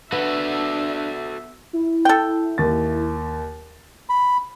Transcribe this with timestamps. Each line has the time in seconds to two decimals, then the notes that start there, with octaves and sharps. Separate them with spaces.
0.12 B3 D4 F#4 A4 E5 F#5
1.73 E4
2.05 A4 G5
2.58 D#2 A6
4.09 B5